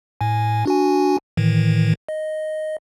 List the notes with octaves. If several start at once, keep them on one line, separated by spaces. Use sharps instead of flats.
A2 G#5
D4 F#4 G#5
A2 D#3 E3
D#5